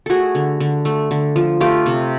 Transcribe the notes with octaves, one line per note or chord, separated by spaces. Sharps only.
A3 F#4 G#4 A4
D3
D3
A3
D3
F3
A3 F4 G4
C3